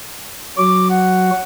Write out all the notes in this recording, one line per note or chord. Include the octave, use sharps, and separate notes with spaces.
F#3 F#4 D6
F#5